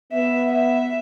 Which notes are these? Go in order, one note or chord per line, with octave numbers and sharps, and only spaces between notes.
B3 E5
E5